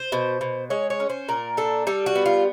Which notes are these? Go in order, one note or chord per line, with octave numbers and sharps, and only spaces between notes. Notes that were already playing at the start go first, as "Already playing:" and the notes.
Already playing: C5
B2
B2
G#3 C#5
C#5
C#4
C5
A#2 A#4
D4 A4
G3 A4
F#4
B3
F4